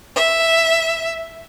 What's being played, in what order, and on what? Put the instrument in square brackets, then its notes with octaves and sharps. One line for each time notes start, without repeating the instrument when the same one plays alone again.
[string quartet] E5